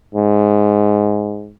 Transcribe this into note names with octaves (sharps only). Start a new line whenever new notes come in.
G#2